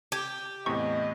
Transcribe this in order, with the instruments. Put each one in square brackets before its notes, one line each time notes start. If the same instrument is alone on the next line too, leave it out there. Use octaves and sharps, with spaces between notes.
[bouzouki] G4 [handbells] A5 D6 G#6
[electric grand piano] E2 A2 C3 [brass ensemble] B3 D#5 [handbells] C#6